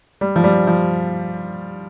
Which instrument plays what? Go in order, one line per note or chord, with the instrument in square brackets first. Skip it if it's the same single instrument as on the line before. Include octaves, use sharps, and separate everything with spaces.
[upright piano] G3
F3
G3
F3